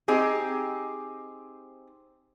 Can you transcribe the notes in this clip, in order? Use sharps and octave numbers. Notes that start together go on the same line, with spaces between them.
C4 D#4 G4 G#4